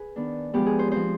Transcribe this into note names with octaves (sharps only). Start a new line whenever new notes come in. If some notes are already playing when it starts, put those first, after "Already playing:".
Already playing: G#4 B4
D#3 B3 D4
F3 G#3 B3 G4
G#4
C5
F3 C4 C5